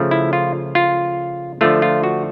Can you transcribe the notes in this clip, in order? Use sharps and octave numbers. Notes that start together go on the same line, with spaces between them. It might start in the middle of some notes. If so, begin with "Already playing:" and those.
Already playing: C#3 F3 A3
E4
F4
F4
D3 F3 A3 F4
F4
F#4